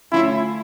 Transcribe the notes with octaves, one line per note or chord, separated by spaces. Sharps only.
D3 A3 C#4 E4 F4